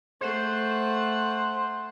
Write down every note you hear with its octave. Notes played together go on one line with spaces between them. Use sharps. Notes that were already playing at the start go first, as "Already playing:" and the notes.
A3 C5 F#5